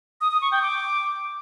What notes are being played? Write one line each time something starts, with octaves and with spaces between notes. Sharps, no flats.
D#6
D#6
C#6
G5
D6